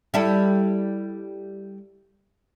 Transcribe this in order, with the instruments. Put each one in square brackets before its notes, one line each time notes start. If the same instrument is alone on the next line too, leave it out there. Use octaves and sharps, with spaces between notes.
[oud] G3 E4 A4